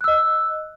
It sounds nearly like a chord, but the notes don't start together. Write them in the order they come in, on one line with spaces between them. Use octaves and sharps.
F#6 E6 D#5